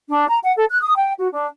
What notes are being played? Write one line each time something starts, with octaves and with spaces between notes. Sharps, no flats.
D4
A#5
F#5
A4
F#6
D#6
G5
F#4
D4